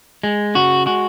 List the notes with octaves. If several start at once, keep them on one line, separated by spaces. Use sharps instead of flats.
G#3
C#3 F#4
G#3 F#4